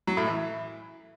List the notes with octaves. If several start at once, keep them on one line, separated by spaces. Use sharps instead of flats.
F#3
A2
E3